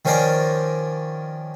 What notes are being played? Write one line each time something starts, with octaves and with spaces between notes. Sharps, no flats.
D#3 F3 C#4 A#4 C5 D5